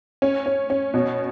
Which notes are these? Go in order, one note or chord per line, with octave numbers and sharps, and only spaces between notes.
C#4
C#4
C#4
B2